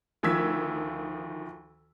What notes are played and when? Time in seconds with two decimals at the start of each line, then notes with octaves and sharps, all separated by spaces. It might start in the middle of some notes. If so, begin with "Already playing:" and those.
0.23 D2 D#3 F3 E6 G#6 B6